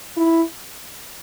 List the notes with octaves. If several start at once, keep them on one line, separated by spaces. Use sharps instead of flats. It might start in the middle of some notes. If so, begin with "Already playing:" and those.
E4